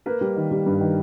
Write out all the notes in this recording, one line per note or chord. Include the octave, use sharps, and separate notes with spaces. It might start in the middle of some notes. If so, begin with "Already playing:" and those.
A#3 B4
G3
D#3
G3
G2
D#3